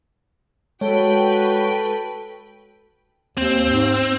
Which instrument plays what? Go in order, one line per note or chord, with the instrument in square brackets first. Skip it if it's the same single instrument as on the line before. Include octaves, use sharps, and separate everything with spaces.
[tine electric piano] G#3 C#5 [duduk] F#4 [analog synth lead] A4 [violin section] B4 G5
[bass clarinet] D#2 [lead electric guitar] C4
[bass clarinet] G#2